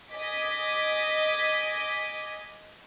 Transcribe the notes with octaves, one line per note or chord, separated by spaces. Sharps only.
D#5 G#5 D6 B6